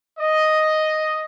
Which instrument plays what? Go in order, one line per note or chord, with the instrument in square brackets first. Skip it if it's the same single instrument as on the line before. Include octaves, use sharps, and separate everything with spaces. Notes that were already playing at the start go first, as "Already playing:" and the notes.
[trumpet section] D#5